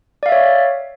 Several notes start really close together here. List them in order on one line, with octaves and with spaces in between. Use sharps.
D5 F5 E5 C#5